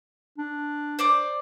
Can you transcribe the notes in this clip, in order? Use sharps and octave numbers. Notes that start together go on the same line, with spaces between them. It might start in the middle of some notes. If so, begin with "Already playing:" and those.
D4
C5 D5 D6